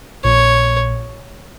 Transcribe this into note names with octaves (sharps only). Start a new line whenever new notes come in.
A#1 A#2 C#5